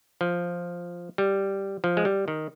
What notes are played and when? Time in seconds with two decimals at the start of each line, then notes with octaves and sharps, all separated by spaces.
0.21 F3
1.18 G3
1.84 F3
1.97 G#3
2.05 G3
2.28 D#3